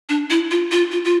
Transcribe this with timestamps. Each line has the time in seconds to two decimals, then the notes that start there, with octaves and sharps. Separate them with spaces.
0.09 D4
0.30 E4
0.51 F4
0.71 F4
0.92 F4
1.05 F4